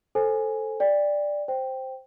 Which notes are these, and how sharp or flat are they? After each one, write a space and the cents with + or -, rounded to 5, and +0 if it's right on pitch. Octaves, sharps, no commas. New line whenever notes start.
A4 +0 C5 +10 G#5 +0
D5 +0 G5 +25
C5 +0 G5 +0